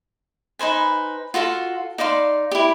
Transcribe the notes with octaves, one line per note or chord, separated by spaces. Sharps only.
D#4 B4 C5 G#5
F4 F#4 A4 F5
D#4 D5 F5 C6
E4 G4